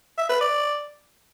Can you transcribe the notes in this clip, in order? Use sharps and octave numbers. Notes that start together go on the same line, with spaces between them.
E5
B4
D5